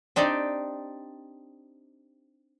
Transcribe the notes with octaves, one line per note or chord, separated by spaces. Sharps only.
C4 D4 D#4 G4 D5